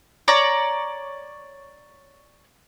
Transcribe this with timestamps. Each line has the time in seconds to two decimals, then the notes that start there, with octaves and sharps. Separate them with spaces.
0.28 C#5 D5 A#5